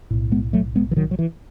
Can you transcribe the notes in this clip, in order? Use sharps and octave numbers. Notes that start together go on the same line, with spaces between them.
B1 A2
G#3 B3
F#3 A3
G#3 B3
E3
D#3 F#3
F#3
E3